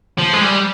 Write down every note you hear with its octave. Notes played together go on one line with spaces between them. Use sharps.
F3
G#3
G3